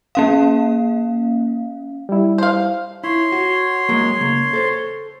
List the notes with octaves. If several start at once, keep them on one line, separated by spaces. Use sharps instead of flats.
A#3 C#4 F5
G3 E4
C5 F5
E4 C#5 C6
F#4
F#3 G#3 A#3
C#3 A#3
A4 C5